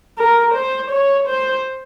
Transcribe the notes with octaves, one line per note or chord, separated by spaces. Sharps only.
A#4
C5
C#5
C5